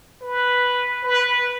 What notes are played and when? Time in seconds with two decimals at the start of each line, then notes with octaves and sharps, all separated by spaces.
0.21 B4
1.03 B4